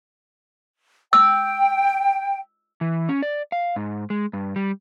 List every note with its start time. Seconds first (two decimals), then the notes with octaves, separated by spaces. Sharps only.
1.13 G5 E6
2.81 E3
3.09 C#4
3.22 D5
3.52 F5
3.76 G#2
4.10 G#3
4.33 G2
4.56 G3